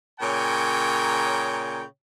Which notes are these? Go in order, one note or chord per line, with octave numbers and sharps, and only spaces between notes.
A#2 C#3 C#5 G5 G#5 A#5